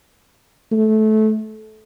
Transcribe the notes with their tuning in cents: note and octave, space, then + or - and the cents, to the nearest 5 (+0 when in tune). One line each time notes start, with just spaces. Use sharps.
A3 -20